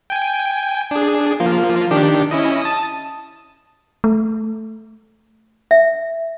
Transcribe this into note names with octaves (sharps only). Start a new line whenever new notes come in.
G5 G#5
D4 G#4
F3 A#3 F4
D#3 D4 G4
C#4 E4 D#5
A5 D#6
A3
E5